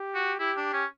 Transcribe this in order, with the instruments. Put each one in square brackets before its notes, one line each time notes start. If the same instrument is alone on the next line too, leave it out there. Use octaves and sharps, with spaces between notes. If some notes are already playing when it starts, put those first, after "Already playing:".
Already playing: [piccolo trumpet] G4
[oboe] F#4
[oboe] E4 [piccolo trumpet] G4
[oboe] D4
C#4